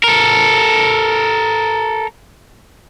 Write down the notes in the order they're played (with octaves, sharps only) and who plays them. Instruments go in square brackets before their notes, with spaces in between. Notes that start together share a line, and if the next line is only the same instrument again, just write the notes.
[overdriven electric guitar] A4 A#4